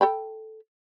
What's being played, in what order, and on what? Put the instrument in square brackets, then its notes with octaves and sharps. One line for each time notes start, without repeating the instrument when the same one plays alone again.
[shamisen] A4 G5 B5